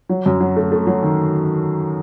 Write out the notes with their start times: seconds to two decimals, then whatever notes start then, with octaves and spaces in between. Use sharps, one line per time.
0.09 F#3
0.26 F#2
0.40 F#3
0.57 A3
0.72 A3
0.87 F#3
1.02 D#3